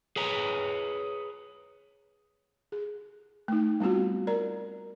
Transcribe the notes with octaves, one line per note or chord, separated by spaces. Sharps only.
G#4 B4 C#5 A#5
G#4
A3 D#4
G3 B3 C4 F4 F#4
A#4 D5 A#5